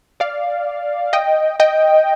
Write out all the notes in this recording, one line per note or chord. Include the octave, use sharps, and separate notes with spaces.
D5 F5
D#5 G5
D#5 G5